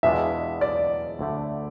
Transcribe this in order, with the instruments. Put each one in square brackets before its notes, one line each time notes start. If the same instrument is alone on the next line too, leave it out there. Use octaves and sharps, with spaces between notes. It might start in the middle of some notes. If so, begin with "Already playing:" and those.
[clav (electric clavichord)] E2 B2 G#3 D4 F4 [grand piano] E5
[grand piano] D5
[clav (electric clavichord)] D2 D3 A3